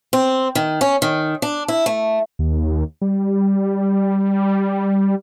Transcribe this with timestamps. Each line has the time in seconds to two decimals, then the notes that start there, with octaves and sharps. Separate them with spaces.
0.13 C4
0.55 D#3
0.81 C#4
1.02 D#3
1.42 D4
1.68 E4
1.86 A3
2.39 D#2
3.02 G3